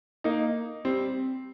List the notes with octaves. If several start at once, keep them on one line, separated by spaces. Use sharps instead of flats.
A#3 D#4
G3 C4